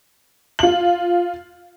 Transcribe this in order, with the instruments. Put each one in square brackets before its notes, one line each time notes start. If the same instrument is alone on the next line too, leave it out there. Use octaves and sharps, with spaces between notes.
[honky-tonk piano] F4 F#7